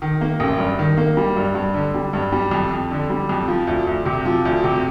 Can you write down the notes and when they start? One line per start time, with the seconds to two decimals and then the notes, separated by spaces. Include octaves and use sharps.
0.02 D#3
0.21 A#3
0.40 A1
0.58 G2
0.79 D#3
0.97 A#3
1.17 G3
1.37 G2
1.55 G2
1.74 D3
1.94 G3
2.13 G2
2.32 G3
2.51 F2
2.71 F2
2.91 D3
3.10 G3
3.29 F2
3.48 F3
3.67 D2
3.87 D2
4.05 C3
4.25 F3
4.45 D2
4.64 C3